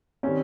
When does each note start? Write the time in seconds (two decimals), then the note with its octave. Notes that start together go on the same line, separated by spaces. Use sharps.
0.23 D#3 G3 C4 C#4